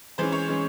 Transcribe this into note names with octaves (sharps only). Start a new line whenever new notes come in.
E3 G#3 C#4 C5
C#5
E3 G#3 C#4